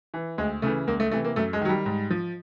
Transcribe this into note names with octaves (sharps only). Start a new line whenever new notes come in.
E3
D2 G#3
C#3 E3 A3
C#2 A#3
A3
C3 E3 A3
A#3
F#2 A3
G#3
D#3 F#3
G3
G#2
F3